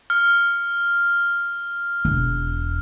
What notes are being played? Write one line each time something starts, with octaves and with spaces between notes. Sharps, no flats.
F6
E1